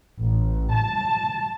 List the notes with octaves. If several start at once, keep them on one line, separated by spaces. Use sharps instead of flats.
A1
A5